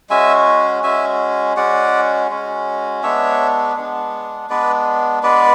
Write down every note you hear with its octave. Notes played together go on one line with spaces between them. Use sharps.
G#3 C#4 F#4 E5 G#5
G#3 C#4 F#4 E5 G#5
G#3 C#4 F#4 D5 F#5
G#3 C#4 F#4
G#3 B3 D4 C#5 E5
G#3 B3 D4
G#3 B3 D4 B4 D5
G#3 B3 D4 B4 D5